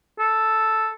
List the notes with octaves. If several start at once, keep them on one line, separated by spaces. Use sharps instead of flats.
A4